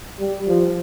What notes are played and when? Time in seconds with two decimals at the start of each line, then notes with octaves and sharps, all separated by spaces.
0.19 G3
0.48 F3